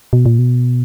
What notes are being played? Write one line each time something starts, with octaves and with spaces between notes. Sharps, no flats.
B2
A#2
B2